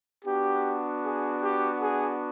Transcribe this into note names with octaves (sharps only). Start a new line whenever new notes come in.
B3 D4 F#4 G4
G#4
G4
G#4